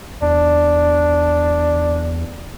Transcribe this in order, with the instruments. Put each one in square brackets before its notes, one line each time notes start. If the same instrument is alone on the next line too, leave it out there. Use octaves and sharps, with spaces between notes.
[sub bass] E2 [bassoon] D4